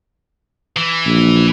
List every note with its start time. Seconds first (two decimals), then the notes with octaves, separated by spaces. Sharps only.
0.77 E3
1.06 A#1